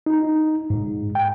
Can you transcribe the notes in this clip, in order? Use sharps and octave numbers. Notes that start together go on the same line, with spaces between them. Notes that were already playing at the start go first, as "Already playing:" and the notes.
D#4
G#2
G5